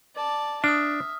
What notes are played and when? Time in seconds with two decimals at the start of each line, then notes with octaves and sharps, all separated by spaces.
0.16 D5 A5
0.64 D4 E5 D#6 F6